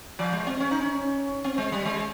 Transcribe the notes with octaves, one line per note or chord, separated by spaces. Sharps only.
F3
G#3
C4
C#4
D#4
C#4
C4
G#3
G3
G#3